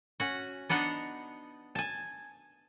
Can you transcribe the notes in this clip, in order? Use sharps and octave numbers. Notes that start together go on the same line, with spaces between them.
C#4 F#4
B3 D4 D#4 F#5
G#5 A5